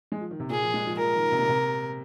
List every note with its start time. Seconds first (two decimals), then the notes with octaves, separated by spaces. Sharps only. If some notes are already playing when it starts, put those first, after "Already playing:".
0.12 G#3
0.21 F3
0.31 D#3
0.40 C3
0.50 A#2 G#4
0.62 F3
0.74 G#3
0.87 F3
0.98 F3 A#4
1.15 D#3
1.32 C3
1.39 A#2
1.49 C3